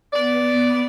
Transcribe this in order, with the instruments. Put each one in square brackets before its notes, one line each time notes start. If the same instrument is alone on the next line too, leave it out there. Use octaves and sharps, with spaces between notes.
[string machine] B3 [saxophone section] D5